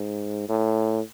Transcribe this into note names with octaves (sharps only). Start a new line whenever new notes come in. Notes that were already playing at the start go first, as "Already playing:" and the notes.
Already playing: G#2
A2